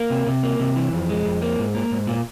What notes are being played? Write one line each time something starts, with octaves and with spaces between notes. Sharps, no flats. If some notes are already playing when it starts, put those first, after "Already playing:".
Already playing: A#3
C3
C3
A#3
C3
E3
F2
G#3
F2
A#3
G#2
A#3
G#2
A#2